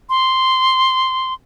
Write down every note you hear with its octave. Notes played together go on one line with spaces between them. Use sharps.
C6